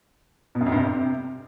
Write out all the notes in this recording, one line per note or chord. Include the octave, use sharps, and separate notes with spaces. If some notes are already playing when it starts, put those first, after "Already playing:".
B2
F#2
F2
G2
C3